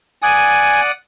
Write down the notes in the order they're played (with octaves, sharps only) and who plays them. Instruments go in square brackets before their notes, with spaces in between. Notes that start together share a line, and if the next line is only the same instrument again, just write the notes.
[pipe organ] D5 F#5 D#6 [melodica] G#5